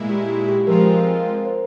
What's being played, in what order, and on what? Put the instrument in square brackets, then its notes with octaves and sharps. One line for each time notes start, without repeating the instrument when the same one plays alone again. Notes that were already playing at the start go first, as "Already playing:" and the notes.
Already playing: [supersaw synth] A#2 G#3 E4
[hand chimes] G4
G4
G4
[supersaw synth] F3 G#3 C4 F4 [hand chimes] A#4
[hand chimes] A#4
C5